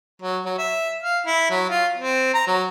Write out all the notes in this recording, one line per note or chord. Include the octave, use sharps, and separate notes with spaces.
F#3
F#3
E5
F5
E4
F#3
F4
C4
A#5
F#3